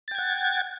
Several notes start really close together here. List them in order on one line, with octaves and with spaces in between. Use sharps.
A6 G5 G#6 F#5